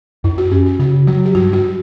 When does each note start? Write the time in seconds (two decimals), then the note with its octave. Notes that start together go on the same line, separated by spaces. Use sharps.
0.24 F#2 E4
0.38 F#4
0.51 C#4 G4
0.66 F#4
0.79 C#3 F#4
1.07 F#3 F#4
1.25 G4
1.35 G2 F#4
1.53 F#4